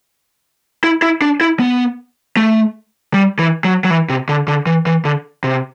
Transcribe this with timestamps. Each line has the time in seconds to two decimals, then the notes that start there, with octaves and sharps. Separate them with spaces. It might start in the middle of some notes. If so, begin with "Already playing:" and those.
0.84 E4
1.02 E4
1.22 D4
1.41 E4
1.60 B3
2.37 A3
3.14 G3
3.39 E3
3.64 F#3
3.84 F#3
3.90 E3
4.10 C3
4.29 D3
4.48 D3
4.66 E3
4.86 E3
5.05 D3
5.44 C3